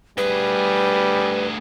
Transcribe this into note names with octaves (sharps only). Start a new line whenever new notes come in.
D2 G3 G#4 B4